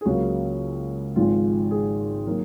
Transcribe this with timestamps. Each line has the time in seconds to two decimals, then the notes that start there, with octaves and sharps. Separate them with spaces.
0.01 G#4
0.05 C#2 C#3 F#3 A#3 F#4
1.16 G#1 G#2 F3 G#3 F4
1.71 G#4
2.26 D#3 F#3 A#3